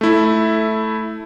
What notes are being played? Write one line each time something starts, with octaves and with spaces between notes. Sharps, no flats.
A3 E4